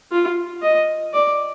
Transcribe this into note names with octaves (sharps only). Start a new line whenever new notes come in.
F4
D#5
D5